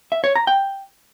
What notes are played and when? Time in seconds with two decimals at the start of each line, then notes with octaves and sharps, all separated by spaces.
0.12 E5
0.24 C#5
0.36 A#5
0.47 G5